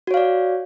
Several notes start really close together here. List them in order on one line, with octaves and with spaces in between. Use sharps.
F#4 C#5 F5 D5